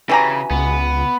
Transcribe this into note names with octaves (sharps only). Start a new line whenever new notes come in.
C#3 E3 F#4 G4 G#5 A#5 B5
C#2 B3